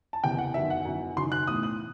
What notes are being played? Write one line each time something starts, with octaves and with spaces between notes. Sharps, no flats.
A5
F#1 E2 C3 E3 G5
F#5
G1 F#2 D#3 E5
F#5
G1 F#2 E3
F#1 F#2 D#3 C6
F#6
B1 A2 E3 D#6
F#6